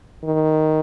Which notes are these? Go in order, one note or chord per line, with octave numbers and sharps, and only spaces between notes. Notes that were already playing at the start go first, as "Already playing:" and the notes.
D#3